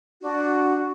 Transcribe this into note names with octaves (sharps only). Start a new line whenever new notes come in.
D4 F#4